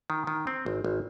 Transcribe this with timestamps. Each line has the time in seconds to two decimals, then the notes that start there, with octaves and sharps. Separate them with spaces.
0.10 D#3
0.27 D#3
0.47 C4
0.66 G#1
0.85 G#1